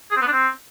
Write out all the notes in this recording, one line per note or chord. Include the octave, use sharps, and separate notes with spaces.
G#4
C4
B3
D4
C4